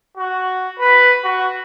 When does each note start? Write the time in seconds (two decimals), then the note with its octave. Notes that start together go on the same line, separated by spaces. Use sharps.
0.17 F#4
0.79 B4
1.24 F#4